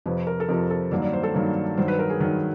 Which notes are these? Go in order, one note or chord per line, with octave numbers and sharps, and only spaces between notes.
F2 C3 F3 B4
A#4
A4
F2 C3 F3 A#4
A4
G2 D#3 F#3 A#3 D5
D5
C5
A4
G2 D#3 F#3 A#3
G2 D#3 F#3 C5
B4
A#4
G#4
G2 D#3 F#3